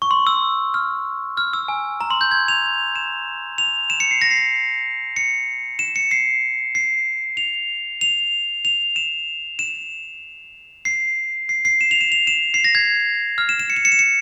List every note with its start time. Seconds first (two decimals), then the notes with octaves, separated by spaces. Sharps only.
0.02 C#6
0.11 C6
0.27 E6
0.74 F6
1.37 F6
1.53 E6
1.68 G#5
2.01 A#5
2.10 C6
2.21 G6
2.31 G#6
2.48 F7
2.95 E7
3.58 F7
3.90 E7
4.00 C#7
4.11 C7
4.21 A#6
4.31 C7
4.37 A#6
5.16 C#7
5.79 E7
5.96 C#7
6.11 C7
6.75 C7
7.37 F7
8.01 F7
8.65 F7
8.96 E7
9.59 E7
10.85 C7
11.49 C7
11.65 C7
11.81 E7
11.91 F7
12.01 E7
12.12 F7
12.27 E7
12.54 C7
12.64 A#6
12.75 G#6
13.38 F6
13.49 E7
13.59 E7
13.70 C#7
13.76 E7
13.85 C#7
13.92 E7
13.99 C#7